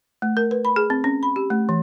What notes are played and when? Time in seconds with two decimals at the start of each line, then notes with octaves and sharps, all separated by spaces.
0.22 A3
0.37 A#4
0.51 B4
0.65 B5
0.76 G#4
0.90 C4
1.04 C#4
1.23 B5
1.36 G4
1.50 A3
1.69 E3